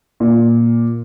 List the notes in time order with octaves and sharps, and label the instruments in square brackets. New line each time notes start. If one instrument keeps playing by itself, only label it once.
[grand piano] A#2